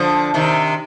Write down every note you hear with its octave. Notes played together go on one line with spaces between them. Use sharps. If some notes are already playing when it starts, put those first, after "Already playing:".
Already playing: D3 F3
C3 D#3